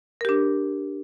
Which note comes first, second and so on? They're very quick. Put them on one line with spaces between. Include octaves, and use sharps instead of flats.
A#4 G4 D4